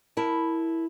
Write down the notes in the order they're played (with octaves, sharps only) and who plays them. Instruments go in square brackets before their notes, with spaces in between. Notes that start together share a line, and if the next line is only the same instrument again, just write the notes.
[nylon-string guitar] E4 A#4 A5